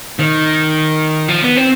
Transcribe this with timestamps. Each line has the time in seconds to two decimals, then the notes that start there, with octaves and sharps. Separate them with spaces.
0.20 D#3
1.28 F3
1.42 B3
1.56 C4